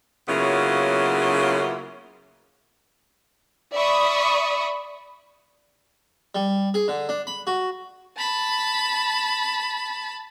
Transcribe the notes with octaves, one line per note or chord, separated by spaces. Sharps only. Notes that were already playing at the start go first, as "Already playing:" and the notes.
C#3 F#3 A#3 B3 E4 F4
D5 E5 B5 C#6 D#6
G3
G#4
D3
D4
B5
F#4
A5 B5